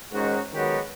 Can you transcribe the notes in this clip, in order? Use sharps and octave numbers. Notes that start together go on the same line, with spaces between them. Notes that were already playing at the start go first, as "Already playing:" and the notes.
G#2 D#3 C#4 D#4 F#4
D#3 F#3 G#3 B3 F#4 G4